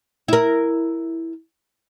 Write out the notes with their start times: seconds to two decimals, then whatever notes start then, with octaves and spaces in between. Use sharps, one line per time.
0.28 E4 A#4